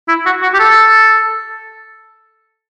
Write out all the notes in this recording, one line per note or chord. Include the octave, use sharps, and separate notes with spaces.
E4
F#4
F#4
G4
A4